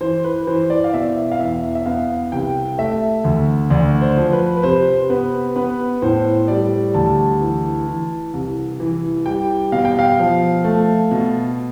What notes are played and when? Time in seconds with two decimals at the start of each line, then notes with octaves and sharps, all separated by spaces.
0.01 E3 C5
0.24 B4
0.47 E3 C5
0.70 D5
0.84 F5
0.93 B2 E5
1.32 F5
1.39 E2 E5
1.75 E5
1.86 B3 F5
2.32 C2 G5
2.78 A3 E5
3.24 D2
3.70 D2 D5
4.01 C5
4.17 F3
4.32 B4
4.57 B4
4.63 C3 C5
5.10 B3 B4
5.56 B3 B4
6.02 A2 C5
6.48 G3 D5
6.94 D2 A5
7.41 E3
7.87 E3
8.33 C2
8.80 E3
9.26 G3 G5
9.72 B2 F5
9.85 G5
9.99 F5
10.19 F3
10.64 A3
11.11 B2